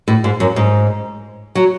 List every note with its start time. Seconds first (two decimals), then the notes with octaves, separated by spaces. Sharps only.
0.08 A2
0.24 G#2
0.40 F#2
0.56 G#2
1.55 F#3